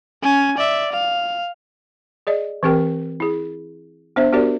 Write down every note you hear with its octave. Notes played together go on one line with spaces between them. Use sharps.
C#4 G#5
D5 E5
F5
G#4 D5 D#5
E3 C4 G4 A#4 G5
E4 G#4
B3 D4 C5 E5
B3 D4 F#4 G4 A#4 D5